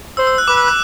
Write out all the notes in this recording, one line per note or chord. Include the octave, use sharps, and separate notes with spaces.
C5 E6
E6
F#6
B4 D6
E6
F#6